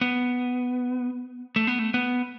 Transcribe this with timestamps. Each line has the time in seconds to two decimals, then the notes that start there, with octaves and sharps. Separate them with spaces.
0.01 B3
1.56 A3
1.67 B3
1.79 A3
1.94 B3